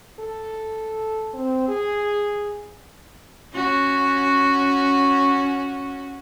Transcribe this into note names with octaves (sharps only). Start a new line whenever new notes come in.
A4
C4
G#4
C#4 F#4